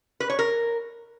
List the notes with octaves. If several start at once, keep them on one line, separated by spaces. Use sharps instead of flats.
B4
C#5
A#4